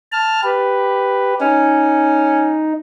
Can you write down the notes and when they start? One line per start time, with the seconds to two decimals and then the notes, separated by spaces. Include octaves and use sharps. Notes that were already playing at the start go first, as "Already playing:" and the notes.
0.12 A5 F6
0.43 G4 B4
1.41 C#4 D#4